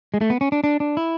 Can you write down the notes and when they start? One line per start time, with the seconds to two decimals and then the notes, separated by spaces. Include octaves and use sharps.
0.14 G#3
0.21 A3
0.30 B3
0.41 C#4
0.52 D4
0.64 D4
0.80 D4
0.97 E4